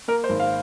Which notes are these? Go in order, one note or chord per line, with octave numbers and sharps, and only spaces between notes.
A#3 A#4
C5
G#1
F5